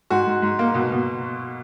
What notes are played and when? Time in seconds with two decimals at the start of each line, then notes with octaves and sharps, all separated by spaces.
0.10 G#2 F#4
0.27 G#2
0.42 G#2
0.59 A#3
0.74 B2
0.92 B2